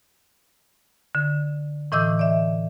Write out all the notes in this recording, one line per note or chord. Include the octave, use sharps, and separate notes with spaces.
D3
A2 E3 D#5 D6 E6 G6
D5 E5